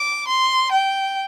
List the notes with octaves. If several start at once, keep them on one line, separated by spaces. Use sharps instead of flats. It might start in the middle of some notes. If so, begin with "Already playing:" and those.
Already playing: D6
C6
G5